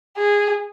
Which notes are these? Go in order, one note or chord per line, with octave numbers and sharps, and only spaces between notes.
G#4